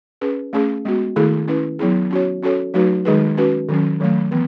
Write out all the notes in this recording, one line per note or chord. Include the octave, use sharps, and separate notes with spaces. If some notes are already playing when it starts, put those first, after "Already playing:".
C#4 G#4 B4
A3 C#4 G#4
G#3 B3 F#4
D#3 A3 E4 G#4
C#4 E4 B4
F#3 B3 E4 G#4
C#4 F#4 C#5
C#4 F#4 A4 C#5
F#3 A3 D#4 F#4 B4
D#3 G#3 D#4 G#4 B4
C#4 F#4 B4
D#3 F#3 C#4
D#3 F#3 A3
E3 B3